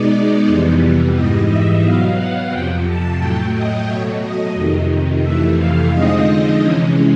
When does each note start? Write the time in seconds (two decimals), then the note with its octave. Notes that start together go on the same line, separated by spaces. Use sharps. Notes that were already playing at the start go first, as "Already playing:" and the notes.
Already playing: B2 G#3 B3 D#4 D5
0.46 F2 C3 E3 G3 B3
1.14 G#2 E3 G3 D#5
1.48 E5
1.82 B2 F#3 B3 F5
2.17 F#5
2.50 F2 C3 F3 G5
2.85 A5
3.18 A2 F#3 A3 G5
3.53 D#5
3.86 B2 F#3 A3 C#5
4.20 D#5
4.54 F2 C3 D#3
5.22 F2 C3 E3 A3 E5
5.56 F5
5.90 D3 F3 G#3 C4 D#4 D#5
6.58 C3 E3 G#3 C#4